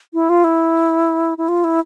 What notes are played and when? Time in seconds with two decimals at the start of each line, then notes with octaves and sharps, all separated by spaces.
0.14 E4
0.29 F4
0.44 E4
1.38 E4
1.48 F4
1.64 E4